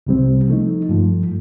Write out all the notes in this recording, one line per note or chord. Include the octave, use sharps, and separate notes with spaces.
C2 C3 G3 C4
F3 A3 D#4
G2 F3 A3